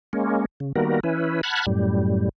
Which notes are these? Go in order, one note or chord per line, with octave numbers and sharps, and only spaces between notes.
G#3 A#3 C#4
C#3
D#3 G3 A#3 B3 F#4 A#4
E3 C#4 E4 B4
F#5 A5 B5 F6 F#6 G#6
F#2 A2 G3